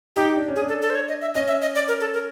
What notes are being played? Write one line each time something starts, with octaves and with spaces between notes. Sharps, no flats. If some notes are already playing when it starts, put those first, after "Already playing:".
D#4 G4
D4
C#4
G#4
D4
A4
A4
C5
C#5
D#5
E5
C#4 D#5
E5
D#5
D5
A#4
A4
A#4